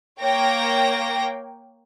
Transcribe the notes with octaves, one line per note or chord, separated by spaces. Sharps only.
A#3 C#5 G5 A#6